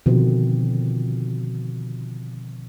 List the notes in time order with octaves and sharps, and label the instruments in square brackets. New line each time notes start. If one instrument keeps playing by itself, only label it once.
[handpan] B2 D3 D#3 F3 C4